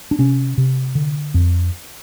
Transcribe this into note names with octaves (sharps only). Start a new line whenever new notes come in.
D4
C3 C#4
C3
D3
F2